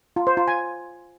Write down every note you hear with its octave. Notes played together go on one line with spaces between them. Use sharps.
F4
C5
F4
G#5